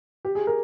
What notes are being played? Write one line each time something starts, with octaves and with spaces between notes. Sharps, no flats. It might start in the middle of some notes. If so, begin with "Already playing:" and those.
G4
G#4
A#4